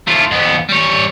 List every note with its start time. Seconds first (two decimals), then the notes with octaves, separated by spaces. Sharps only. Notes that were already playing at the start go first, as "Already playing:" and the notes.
0.07 A3 F4
0.31 F2 B3
0.69 G3 C#5